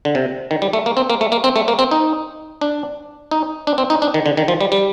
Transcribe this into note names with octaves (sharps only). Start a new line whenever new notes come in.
D3
C3
D#3
G3
A3
A#3
C4
A#3
A3
A#3
C4
A3
A#3
C4
D#4
D4
D#4
D4
C4
D#4
D4
D#3
D3
D#3
F3
G3
G3